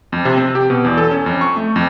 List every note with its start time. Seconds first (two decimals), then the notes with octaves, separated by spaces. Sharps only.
0.12 F2
0.25 C3
0.37 C4
0.55 G4
0.70 B2
0.85 E2
0.97 A4
1.11 C#4
1.26 F2
1.41 C#6
1.57 A3
1.76 F2